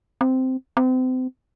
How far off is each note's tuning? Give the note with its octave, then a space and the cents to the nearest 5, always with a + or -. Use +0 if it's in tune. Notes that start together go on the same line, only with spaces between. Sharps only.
C4 -10
C4 -35